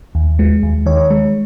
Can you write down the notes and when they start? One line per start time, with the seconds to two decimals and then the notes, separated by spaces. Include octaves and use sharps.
0.15 D#2
0.39 G#3
0.63 D#2
0.86 D#3 C#5
1.10 G#3